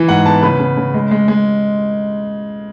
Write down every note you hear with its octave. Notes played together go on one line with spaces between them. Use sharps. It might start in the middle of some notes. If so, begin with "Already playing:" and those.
Already playing: E3
G#2 F#5
B3 A5
C#3 B4
C#3
C#3
G#3
G#3
G#3